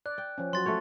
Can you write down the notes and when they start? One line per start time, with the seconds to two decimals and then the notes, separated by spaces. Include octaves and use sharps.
0.06 D5 F#6
0.18 G5
0.38 F3 C#4
0.53 F#3 F#4 C6 A6
0.66 A3 F#4 C#5